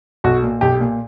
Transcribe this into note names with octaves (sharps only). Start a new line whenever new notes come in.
B1 F#4
A#2
B1 G4
A#2